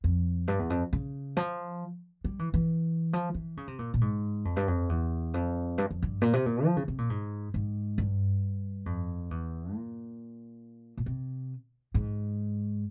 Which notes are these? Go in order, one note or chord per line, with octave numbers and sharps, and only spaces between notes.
F2
G2
E2
F2
C#3
F3
G3
E3
E3
F3
E3
C#3
C3
A#2
A#2
G#2
F2
G2
F2
E2
F2
G2
F2
G2
A#2
C3
A#2
F3
C#3
C3
A#2
G#2
G#2
G2
F2
E2
A#2
A#2
C3
G#2